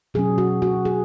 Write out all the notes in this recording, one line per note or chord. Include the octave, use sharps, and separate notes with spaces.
B2 F#3 C#4 G#4
F#4
F#4
G#4